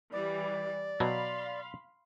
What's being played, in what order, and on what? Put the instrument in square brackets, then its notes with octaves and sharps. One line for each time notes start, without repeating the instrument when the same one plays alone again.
[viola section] E3 G3 [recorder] D5
[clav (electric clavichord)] B2 F#3 [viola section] F5 B5 C6